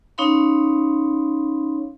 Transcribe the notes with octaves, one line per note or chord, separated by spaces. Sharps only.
C#4 D#4 C#5 F5 B5 C6